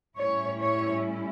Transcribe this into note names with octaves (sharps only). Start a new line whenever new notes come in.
A2 G3 C#4 E4 C#5
C#5